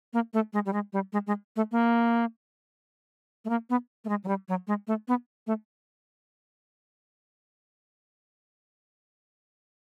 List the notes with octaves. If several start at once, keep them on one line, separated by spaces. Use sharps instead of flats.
A#3
A3
G#3
G3
G#3
G3
G#3
G#3
A3
A#3
A3
A#3
B3
A3
G#3
F#3
G3
F#3
G#3
A3
B3
A3